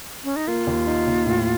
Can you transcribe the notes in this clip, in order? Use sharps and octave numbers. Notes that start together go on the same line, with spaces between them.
C#4
D#4
A#3 F4
D#2
D#4
D#2
A2